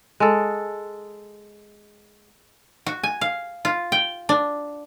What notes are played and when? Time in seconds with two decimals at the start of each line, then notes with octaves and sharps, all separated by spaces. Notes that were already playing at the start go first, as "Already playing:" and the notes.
0.20 G#3 A4
2.86 F#4
3.03 G#5
3.21 F5
3.65 F4
3.92 G5
4.29 D4